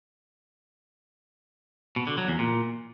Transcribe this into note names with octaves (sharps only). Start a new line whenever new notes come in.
B2
D3
F#3
E2
A#2